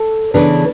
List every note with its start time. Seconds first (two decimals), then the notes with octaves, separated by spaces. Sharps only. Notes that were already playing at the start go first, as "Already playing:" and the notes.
Already playing: A4
0.34 C#3 E3 B3 D4